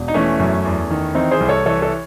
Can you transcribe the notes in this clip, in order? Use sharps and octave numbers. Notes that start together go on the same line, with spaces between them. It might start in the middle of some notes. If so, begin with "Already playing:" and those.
Already playing: E1
D#4
E3 A3 C#4
F#2
E2
D#3
E3 C4 D#4
G#4 C5
C2
A4 C#5
E3 A4 C#5
A4 C#5